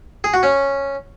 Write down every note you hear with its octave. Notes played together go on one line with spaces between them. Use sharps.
G#4
F#4
C#4